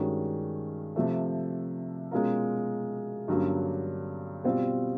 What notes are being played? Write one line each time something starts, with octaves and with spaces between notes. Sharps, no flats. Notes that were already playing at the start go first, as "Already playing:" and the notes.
Already playing: G2 D#3 G#3 C#4 F#4
C3 F3 A3
B2 G#3 C#4 F4 A#4
G2 D3 F#3 A#3 C#4
B2 G3 C4 F4